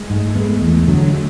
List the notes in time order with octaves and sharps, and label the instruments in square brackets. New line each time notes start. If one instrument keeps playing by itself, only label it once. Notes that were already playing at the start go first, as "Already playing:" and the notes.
Already playing: [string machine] G#3
[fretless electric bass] G#2 [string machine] A3
[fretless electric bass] G#3 B3
E2
D3 F#3